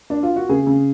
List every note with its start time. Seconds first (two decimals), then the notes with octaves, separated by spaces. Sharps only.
0.10 D4
0.23 F4
0.36 F#4
0.49 C#3 G#4
0.67 C#3